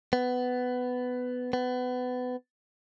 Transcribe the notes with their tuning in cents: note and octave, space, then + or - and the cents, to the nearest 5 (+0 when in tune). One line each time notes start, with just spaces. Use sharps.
B3 +15
B3 +25